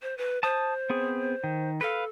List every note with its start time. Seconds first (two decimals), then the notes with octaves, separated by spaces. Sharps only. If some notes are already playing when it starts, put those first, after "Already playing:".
0.02 C5
0.18 B4
0.43 C5 A5 D#6
0.90 B3 C4 G#4
1.44 D#3
1.81 A4 B4 F5